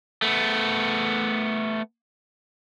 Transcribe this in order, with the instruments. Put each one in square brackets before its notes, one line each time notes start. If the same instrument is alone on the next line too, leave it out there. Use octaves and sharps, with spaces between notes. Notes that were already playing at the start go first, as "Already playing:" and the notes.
[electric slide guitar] A3 B3